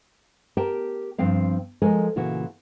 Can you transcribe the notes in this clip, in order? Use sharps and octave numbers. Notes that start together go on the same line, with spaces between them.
G4 A#4 G5 A5
G2 F3 C4 F5
F3 G#3 A4 A#4 D#5 G#5
A#2 C#3 E3 F#4